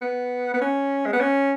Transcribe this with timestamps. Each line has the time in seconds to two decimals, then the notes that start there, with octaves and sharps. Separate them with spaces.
0.02 B3
0.54 B3
0.62 C#4
1.06 G#3
1.13 B3
1.21 C#4